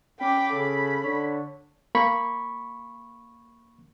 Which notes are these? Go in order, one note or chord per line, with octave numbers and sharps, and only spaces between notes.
C#4 G5 B5 D6
C#3 A4
D3 C#5
A#3 B5 C#6